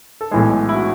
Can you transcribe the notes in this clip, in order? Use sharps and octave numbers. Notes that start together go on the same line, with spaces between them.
A4
B1 A2 E3 G#3 G#4
E4
F#4